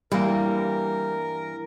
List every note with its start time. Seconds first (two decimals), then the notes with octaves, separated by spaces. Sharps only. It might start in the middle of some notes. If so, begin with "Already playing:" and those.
0.12 G2 E3 G3 A#3 A#4